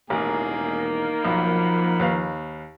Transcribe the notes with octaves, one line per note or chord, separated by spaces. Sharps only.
E1 A1 D#3 A#3 G#4
B1 F3 F#5 B5
D#2 B4 F5